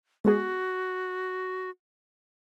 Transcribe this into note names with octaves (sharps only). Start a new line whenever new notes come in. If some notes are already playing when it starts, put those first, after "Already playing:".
G#3 B3 F#4 G#4